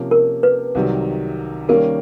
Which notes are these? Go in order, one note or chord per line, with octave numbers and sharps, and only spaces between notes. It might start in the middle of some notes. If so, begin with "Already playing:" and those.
Already playing: C3 F3 A#3 C#4
A#4
B4
C2 C3 D#3 F#3
D#3 G3 A#3 C#4 A#4